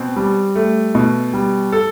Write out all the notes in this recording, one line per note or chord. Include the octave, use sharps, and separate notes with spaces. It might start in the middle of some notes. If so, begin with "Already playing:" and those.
Already playing: B2 C4
G3
A3
B2
G3
A4